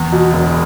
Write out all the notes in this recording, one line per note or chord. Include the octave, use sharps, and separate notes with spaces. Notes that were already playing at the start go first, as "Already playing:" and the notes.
Already playing: E2
B2
E1